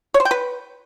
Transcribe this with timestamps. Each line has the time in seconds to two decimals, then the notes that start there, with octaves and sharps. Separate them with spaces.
0.14 C#5
0.20 C5
0.25 G5
0.31 B4